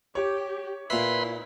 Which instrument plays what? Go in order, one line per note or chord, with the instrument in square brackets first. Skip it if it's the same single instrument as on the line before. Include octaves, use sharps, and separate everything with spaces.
[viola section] G4 [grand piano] C#5
[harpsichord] A#2 E5 [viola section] E4 [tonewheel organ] B4 B5 C6